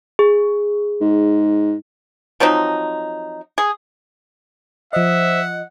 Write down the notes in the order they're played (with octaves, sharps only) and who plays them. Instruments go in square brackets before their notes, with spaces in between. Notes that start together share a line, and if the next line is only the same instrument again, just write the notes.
[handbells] G#4
[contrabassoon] G#2
[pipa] F3 F#3 C4 D#4
G#4
[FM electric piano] F3 D#5 [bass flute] C5 [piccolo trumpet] E5 [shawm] F#5